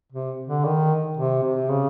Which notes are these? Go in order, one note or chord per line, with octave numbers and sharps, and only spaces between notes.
C3
D3
D#3
C3
C3
C#3